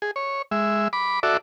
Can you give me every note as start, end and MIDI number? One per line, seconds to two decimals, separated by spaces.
0.02 0.11 68
0.16 0.42 73
0.51 0.88 56
0.51 0.88 76
0.93 1.20 83
0.93 1.20 86
1.23 1.37 66
1.23 1.37 69
1.23 1.37 74
1.23 1.37 76